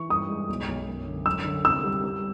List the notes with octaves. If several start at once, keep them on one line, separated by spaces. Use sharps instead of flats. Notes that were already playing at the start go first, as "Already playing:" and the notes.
Already playing: E3 C#6
G2 D#6
G#3
B1
B1
F#2
D3
F#2 E6
D3
C3 E6
G3
G3